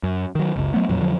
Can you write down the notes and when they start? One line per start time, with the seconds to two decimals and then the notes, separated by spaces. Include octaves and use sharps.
0.03 F#2
0.35 D#3 F#3
0.56 F#1 C#2
0.74 F#3 A3 B3
0.89 F2 A#2 F#3
1.01 F2 D3 F3 F#3